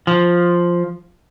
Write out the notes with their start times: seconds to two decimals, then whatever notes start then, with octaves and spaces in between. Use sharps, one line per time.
0.07 F3